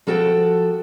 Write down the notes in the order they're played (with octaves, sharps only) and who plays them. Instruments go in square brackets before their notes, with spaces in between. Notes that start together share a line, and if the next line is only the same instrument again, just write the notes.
[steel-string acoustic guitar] F3 F#4 A4 F#5 G5